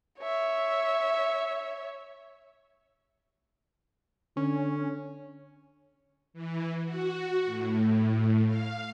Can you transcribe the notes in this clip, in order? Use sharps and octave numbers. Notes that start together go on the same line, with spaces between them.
C#5 E5
D3 C#4
E3
F#4
A2
F5